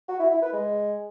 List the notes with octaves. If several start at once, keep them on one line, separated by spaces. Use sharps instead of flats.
F#4
E4
E4
B4
G#3